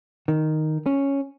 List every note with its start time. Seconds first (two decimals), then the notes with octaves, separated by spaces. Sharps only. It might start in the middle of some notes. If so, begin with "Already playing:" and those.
0.28 D#3
0.86 C#4